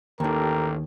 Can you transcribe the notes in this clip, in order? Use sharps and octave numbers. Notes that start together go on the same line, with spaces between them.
A1 D#2 D#3 G4 A4 A#4